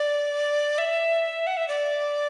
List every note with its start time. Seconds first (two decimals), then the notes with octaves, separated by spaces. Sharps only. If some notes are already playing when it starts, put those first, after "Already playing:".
Already playing: D5
0.78 E5
1.47 F#5
1.57 E5
1.68 D5